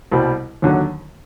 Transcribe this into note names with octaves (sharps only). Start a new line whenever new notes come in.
C2 B2 G3
D#2 D3 F#3